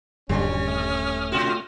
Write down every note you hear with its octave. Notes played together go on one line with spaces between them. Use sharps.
D#1 G2 D3 F#3 G3 C#4
A3 D#6 F6
B2 F4 F#4